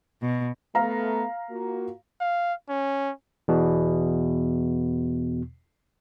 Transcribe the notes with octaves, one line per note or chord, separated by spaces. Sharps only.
B2
A3 B3 F5 A#5
A#3 F4 F#4
F5
C#4
E2 B2